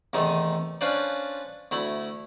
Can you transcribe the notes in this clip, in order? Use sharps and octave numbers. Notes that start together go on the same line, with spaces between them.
E2 C3 D#3 A3
C#4 D4 F4 B4 C5 D5
D2 A3 E4 B5